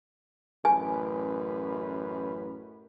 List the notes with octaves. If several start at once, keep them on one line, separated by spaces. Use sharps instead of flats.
A1 F#2 B4 G#5